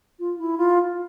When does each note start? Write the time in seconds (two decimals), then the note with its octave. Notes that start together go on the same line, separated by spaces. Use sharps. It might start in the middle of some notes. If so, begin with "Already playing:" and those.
0.19 F4
0.39 E4
0.58 F4